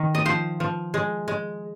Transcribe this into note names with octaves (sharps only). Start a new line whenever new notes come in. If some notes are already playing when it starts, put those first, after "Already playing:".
Already playing: D#3
D#5
F3 C5
F3
G#3
G#3